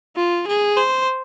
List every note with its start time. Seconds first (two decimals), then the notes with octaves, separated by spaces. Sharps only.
0.16 F4
0.47 G#4
0.77 C5